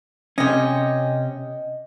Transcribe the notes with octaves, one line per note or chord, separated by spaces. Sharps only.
C3 C#4 D#5 G5